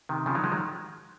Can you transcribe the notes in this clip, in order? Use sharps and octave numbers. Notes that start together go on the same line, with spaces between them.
C3 D#3
C#3 F3
D#3 F#3
F3 G#3
D#3 F#3